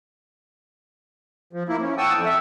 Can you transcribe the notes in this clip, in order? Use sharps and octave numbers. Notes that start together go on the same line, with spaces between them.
F3
A#3 E4
C#4
F#5 G5 A5 C#6 D#6 E6
F2
E5